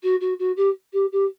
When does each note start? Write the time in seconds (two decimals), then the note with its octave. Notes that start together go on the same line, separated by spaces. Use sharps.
0.02 F#4
0.20 F#4
0.38 F#4
0.56 G4
0.92 G4
1.11 G4